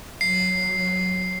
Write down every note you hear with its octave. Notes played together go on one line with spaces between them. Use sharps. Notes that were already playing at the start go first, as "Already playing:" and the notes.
F#3 C7